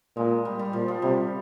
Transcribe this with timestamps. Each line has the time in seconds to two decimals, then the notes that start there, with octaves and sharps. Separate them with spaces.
0.16 A#2 G#3
0.45 G3
0.59 G3
0.73 A#2 F3
0.88 F3
1.02 C3 G3